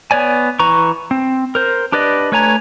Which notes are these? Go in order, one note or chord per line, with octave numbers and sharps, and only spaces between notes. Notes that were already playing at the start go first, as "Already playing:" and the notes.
B3 C#5 D5 G#5
E3 B4 A#5 C#6
C4
A#4 C5
D4 G4 B4 D5 D#5
A3 B4 C#5 G#5 A#5